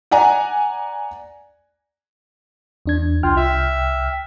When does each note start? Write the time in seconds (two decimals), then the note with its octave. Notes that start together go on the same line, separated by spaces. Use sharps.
0.11 D5 F#5 G#5 A#5
2.86 E2 D4 G#6
3.23 C2 F4 G5 F6
3.37 E5